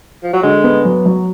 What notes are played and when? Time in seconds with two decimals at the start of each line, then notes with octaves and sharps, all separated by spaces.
0.23 F3
0.33 F#3
0.43 D3 G#3
0.64 B3
0.85 F#3
1.06 F#3